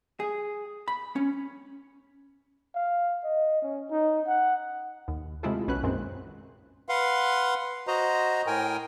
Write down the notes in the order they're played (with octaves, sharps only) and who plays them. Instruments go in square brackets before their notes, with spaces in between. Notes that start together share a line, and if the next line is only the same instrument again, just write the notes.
[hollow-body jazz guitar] G#4
B5
C#4
[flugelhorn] F5
D#5
C#4
D#4
F#5
[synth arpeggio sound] D#2
C3 G#3 A3 E4 F4 A4
B1 C#4 F#4 B4 F#6
F#2 A#2 D#3 G#3 C4 C5
[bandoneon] B4 F5 F#5 C6
F#4 C5 D#5 A#5
A2 A#4 G5 G#5